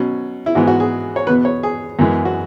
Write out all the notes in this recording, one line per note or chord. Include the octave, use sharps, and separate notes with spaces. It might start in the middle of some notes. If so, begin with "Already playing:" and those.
Already playing: B2 F#3 C#4
E4
G#2 E3 G#3 B3 F#4
F#4
G#4
C#5
E2 B2 B3 B4
C#5
G#4
F#2 E3 G#3 B3
F#4